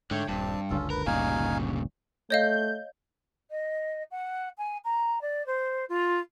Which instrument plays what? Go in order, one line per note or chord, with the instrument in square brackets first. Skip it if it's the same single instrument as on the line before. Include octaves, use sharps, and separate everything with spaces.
[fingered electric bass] G#2 [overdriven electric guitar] D3 [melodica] A3 C#5 G5
[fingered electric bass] D#1 [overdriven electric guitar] G2 [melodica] C4 A5
[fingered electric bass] F#1 C#2 D3 [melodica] C#4 F4 A4
[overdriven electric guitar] A#4 [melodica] B4
[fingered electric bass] G1 D2 G2 [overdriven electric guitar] A#2 C#3 [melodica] D#4 F5 G#5
[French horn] A3 [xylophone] C#5 D#5 F5 [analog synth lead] G6
[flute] D#5
F#5
G#5
A#5
D5
C5
F4